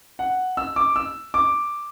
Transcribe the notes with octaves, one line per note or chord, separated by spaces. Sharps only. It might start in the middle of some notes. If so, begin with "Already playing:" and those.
F#5
E6
D6
E6
D6